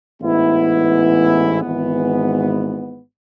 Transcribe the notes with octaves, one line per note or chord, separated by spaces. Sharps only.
A1 G#2 E3 B3 E4
G#1 G#2 E3 B3